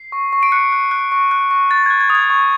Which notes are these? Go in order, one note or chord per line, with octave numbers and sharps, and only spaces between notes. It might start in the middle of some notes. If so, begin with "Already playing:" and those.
Already playing: C7
C#6
C#6
D7
F#6 C#7
F#6
F#6
C#6
F#6
C#6
F#6 A6
F#6 G#6
G#6
D#6
G#6
C#6